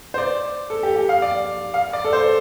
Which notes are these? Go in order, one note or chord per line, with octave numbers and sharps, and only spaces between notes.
C5
D5
A4
G4
G4
F5
D5
F5
D5
A4
C5